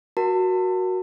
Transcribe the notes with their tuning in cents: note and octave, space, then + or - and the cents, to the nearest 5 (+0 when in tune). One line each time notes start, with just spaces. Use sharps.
F#4 +0 A#4 +15 A5 +35